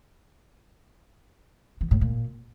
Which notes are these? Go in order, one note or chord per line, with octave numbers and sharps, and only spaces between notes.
E3
A2
A#2